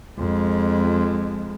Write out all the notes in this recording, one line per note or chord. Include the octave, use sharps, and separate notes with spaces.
F2 G#3